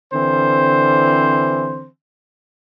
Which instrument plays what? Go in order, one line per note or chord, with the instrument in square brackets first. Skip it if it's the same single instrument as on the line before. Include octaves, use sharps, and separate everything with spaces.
[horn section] D3 E3 C4 C5